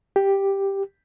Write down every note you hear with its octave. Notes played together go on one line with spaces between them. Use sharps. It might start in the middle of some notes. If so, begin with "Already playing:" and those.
G4